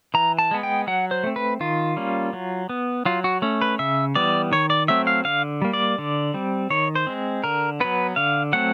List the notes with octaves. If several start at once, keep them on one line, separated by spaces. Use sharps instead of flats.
E3 A#5
A5
G#3 B3
G5
F#3 F#5
C5
A3 C4
B4
D#3 F4
G3 A#3 C#4
F#3
B3
F#3 F4
F#4
A3 C#4
B4
C#3 E5
E3 G3 B3 D5
D#3 C#5
D5
F#3 A3 C4 E5
F5
D3 F5
G3 A#3
D5
D3
G3 C4
D#3 C#5
C5
G#3 C4
D3 A#4
F#3 B3 B4
D3 F5
F#3 A3 C4 F#5